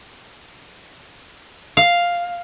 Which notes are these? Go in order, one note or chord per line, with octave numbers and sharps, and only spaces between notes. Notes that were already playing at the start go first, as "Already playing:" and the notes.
F5